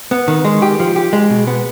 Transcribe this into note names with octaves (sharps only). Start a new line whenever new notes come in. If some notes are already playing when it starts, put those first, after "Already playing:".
B3
D#3
G#3
G4
F3
G4
G#3
B2
B3